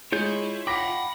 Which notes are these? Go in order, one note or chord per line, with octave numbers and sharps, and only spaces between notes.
G#3 E4 F4 C#5 G6
F#5 G5 B5 D6 A#6 B6